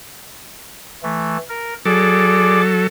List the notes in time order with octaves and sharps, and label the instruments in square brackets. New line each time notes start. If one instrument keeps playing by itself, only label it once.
[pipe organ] E3 A3
A#4
[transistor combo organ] F#3 A4 [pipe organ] G#4 D5 D6